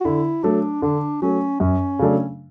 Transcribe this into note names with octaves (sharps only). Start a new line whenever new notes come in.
F#4
D3 E4
F#3 A3 D4
D3 D4
F#3 A3 C#4
F#2 C#4
C#3 F#3 A3 D4